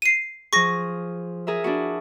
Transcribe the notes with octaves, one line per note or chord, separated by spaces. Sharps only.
C7 D#7
F3 G#4 C#6 A#6
G#4 A#4 E5
D4 E4 F#4